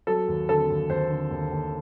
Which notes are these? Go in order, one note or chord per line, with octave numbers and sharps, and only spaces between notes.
F#3 A4
D#2
D3 A4
D#2
D#2 C5
D3
D#2
D#2